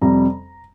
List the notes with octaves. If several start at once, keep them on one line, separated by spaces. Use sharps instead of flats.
F2 C3 G3 A#5